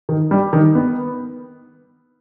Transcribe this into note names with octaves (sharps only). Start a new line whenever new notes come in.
D#3
G3
D#3
B3